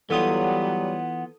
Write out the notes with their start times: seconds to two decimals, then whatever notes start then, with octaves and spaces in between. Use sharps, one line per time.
0.10 E3 F#3 G3 B3 F4 A4 F#5 D#6